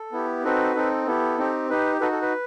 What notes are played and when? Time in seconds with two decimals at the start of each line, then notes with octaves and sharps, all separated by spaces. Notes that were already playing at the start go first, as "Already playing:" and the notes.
Already playing: A4
0.12 B3 E4 G4
0.44 C4 D#4 F#4 A4 B4
0.75 C4 D#4 A4
1.06 B3 E4 G4 A4
1.38 C4 D#4 G4
1.70 D#4 G4 B4
2.01 D#4 F#4 A4 B4
2.12 A4
2.22 B4